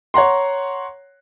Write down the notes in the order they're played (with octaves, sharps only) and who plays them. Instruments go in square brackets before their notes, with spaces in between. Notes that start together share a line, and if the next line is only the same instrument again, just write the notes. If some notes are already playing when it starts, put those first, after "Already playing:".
[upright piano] C#5 F#5 A#5 C6